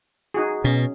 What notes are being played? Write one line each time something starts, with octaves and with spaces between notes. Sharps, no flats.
D#4 F#4 G#4
B2 C#4